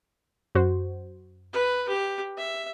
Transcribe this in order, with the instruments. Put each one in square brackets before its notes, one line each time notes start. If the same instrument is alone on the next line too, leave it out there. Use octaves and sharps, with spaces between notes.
[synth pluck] F#2 F#4 C5
[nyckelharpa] B4
G4
E5